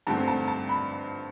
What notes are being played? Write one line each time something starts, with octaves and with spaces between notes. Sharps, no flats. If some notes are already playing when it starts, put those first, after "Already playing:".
G2 D3 A3 C4 A5
A5
A5
B5